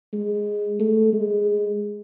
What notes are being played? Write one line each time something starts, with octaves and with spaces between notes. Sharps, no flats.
G#3
A3
G#3